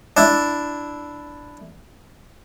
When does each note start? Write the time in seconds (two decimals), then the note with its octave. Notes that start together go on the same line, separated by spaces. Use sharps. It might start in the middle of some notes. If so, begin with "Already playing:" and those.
0.17 D4 E4